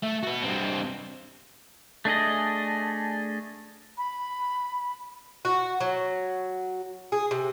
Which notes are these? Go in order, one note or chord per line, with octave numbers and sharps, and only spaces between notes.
A3
F#4 B4
G2 C4
A3 D4 G#4 D#5
B5
F#4
F#3
G#4
C3